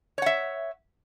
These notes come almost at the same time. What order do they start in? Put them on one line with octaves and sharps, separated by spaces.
C#5 F#5 E5